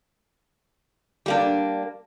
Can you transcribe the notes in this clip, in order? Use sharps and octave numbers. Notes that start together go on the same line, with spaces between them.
G3 A#3 D4